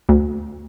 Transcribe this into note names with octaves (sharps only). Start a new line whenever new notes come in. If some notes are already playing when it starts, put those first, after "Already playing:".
D2